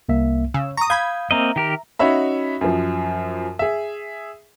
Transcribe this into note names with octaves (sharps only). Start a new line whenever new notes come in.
C2 A#3 E5
C#3 E6
A#5 C#6 D#6
F5 B5 D#6 G6 G#6
A#3 C4 D#5 E5 A#5
D#3 G4 A#4
C#4 D#4 F#4 C#5 E5 B5
F#2 F3
G#4 E5